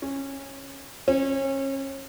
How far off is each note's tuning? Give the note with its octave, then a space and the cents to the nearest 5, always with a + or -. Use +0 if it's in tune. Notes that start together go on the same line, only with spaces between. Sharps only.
C#4 -15
C#4 -30